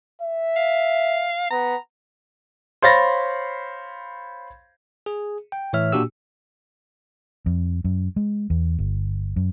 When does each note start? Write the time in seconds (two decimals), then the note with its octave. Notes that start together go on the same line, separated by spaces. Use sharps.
0.21 E5
0.57 F5
1.51 B3 A#5
2.82 C5 C#5 F5 B5 A6 A#6
5.06 G#4
5.52 G5
5.73 A2 E3 C#5 E5 F6
5.92 A#2 A#3 D4 F#4 G4 E6
7.46 F2
7.84 F#2
8.16 G#3
8.50 E2
8.79 G1
9.36 F#2